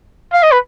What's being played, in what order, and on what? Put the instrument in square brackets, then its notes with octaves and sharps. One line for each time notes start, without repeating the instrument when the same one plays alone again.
[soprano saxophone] F5
D#5
B4